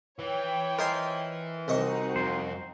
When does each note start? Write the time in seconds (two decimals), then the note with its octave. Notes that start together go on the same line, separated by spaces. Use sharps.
0.19 E3 C#5 G5
0.79 F4 A#4 C5 D#5 G#5
1.68 C2 C4 D#4 F#4 D#5 C#6
2.16 F2 C5